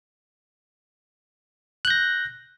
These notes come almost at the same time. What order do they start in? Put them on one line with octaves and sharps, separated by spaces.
F#6 G6 A#6